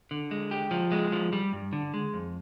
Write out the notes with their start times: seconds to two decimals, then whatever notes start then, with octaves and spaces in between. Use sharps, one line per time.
0.11 D3
0.31 G#3
0.51 G4
0.71 F3
0.92 G#3
1.12 F3
1.33 G3
1.53 G2
1.73 D3
1.94 G#3
2.14 F2